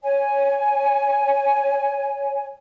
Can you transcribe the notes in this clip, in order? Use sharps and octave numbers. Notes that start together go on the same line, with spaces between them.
C#5 G#5